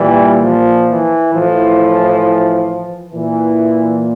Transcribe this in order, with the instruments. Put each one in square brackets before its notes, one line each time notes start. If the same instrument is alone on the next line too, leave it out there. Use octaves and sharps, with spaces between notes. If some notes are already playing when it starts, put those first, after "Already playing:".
Already playing: [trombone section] A#2 E3 G3
F3
E3
A2 E3 F3
A#2 E3